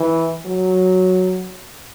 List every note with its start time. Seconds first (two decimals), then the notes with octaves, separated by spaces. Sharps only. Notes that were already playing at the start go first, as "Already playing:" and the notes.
Already playing: E3
0.46 F#3